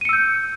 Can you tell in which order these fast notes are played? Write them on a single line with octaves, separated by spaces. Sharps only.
D#7 C#7 E6 G6